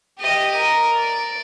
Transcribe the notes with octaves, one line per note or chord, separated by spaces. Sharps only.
G4 D#5
A#4
D5